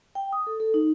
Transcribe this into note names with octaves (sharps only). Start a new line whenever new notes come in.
G5
D#6
A4
A4
D#4